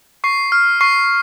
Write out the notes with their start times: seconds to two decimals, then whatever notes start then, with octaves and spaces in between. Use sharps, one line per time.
0.24 C#6 C7
0.52 F6
0.81 C#6 C7